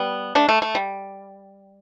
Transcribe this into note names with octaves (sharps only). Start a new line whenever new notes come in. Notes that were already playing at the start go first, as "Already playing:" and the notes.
Already playing: G3 B3
A3 D4
A3
A3
G3